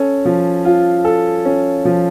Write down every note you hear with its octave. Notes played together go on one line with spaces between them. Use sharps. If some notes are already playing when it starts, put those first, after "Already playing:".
Already playing: C#4 A4
F3
F4
A4
C#4
F3